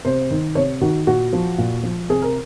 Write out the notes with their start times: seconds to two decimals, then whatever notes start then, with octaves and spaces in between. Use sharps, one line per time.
0.05 C3 C5
0.31 D#3
0.55 C3 C#5
0.81 D#3 F#4
1.07 A#2 F#4
1.33 F3
1.58 A#2
1.83 F3
2.09 C3 G#4
2.22 A#4